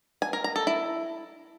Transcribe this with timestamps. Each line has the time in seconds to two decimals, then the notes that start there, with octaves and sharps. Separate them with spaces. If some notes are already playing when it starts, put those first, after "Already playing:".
0.22 G#5
0.33 A#4
0.44 A#5
0.56 A4
0.67 E4